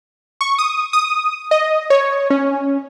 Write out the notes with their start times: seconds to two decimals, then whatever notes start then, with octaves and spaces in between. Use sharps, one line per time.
0.41 C#6
0.59 D#6
0.93 D#6
1.51 D#5
1.90 C#5
2.30 C#4